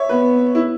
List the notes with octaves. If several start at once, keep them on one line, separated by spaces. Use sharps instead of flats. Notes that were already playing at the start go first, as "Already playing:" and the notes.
Already playing: C#5 E5
B3 B4
E4